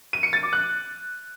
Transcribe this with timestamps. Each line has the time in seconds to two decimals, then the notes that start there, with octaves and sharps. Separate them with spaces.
0.13 D#7
0.23 C#7
0.33 A6
0.43 D6
0.53 F#6